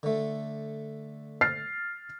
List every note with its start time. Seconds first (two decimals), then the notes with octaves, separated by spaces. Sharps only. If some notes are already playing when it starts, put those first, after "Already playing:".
0.03 D3 A3
1.41 F6 A6 C7